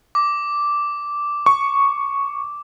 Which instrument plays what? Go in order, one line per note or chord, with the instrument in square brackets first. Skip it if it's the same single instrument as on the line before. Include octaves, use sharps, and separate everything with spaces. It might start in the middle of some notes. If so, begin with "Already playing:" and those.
[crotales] D6
[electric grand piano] C#6